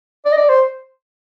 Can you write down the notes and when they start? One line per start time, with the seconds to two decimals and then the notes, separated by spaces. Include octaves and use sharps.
0.25 D5
0.32 D#5
0.37 D5
0.49 C5